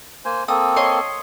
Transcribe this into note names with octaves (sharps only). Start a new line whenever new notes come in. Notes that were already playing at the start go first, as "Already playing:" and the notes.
A#3 C5 G#5
A#3 C4 A4 D#6
C#5 D#5 C6